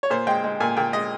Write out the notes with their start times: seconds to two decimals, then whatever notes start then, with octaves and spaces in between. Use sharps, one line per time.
0.03 C#5
0.10 A#2 C5
0.27 G#3 G5
0.44 G#3
0.60 A#2 G#5
0.77 A#2 G5
0.93 G#3 D#5